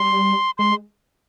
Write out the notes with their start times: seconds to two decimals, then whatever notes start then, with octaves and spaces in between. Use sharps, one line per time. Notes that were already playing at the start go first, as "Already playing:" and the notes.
Already playing: G3 C6
0.58 G#3 C6